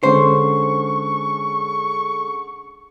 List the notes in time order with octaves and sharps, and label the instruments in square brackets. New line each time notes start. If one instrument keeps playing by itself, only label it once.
[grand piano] D3 G#3 C#4 [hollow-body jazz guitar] C5 [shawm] C#6